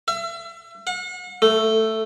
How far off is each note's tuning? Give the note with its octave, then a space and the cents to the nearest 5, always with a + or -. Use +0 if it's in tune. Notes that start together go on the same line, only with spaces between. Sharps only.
E5 +35
F#5 -40
A3 +5